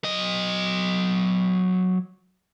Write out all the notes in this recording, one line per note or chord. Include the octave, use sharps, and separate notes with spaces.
F#3 D#5